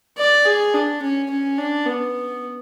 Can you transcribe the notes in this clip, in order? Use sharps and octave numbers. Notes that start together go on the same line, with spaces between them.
D5
G#4
D4
C#4
C#4
D4
B3